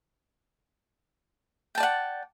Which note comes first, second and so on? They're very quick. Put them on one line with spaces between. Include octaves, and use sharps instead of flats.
G5 A5 D5 F#5